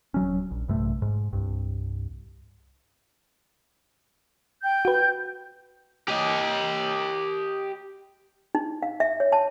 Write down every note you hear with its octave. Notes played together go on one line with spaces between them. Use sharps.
D#1 F#3 C#4
A#1
A#1 G2 C3 A3
G#2
C2 G2
G5 G6
F#4 B4
G4 D#5
D#4
F5
E5
C#5
A5